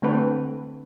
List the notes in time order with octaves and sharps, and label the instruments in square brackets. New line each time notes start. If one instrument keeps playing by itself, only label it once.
[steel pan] D3 A3 C4 A4 B4